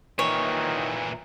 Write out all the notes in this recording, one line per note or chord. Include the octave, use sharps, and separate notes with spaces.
A#2 D#3 E3 C#5